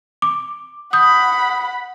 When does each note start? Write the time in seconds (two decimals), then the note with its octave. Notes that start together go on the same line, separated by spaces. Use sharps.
0.22 D6
0.93 F#5 B5 D#6 G6